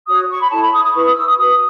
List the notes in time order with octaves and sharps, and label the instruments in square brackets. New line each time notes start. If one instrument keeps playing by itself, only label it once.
[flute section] F#4 C#5 D#6
C#6
B5
E4 A4 C#5 A5
B5
D#6
D#6
E4 B4 C#6
D#6
E6
D#6
F#4 B4 D#6